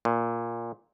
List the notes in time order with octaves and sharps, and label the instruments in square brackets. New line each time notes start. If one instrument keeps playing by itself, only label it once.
[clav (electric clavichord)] A#2